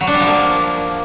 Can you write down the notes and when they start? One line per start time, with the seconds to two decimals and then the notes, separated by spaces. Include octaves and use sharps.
0.01 F#3
0.07 D4
0.14 G3
0.21 F3
0.28 A#3